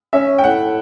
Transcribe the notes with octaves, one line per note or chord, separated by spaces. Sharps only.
C#4 E5
G5
A2 F#5